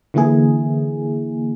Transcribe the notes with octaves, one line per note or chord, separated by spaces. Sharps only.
D3 E3 A#3 E4 G#4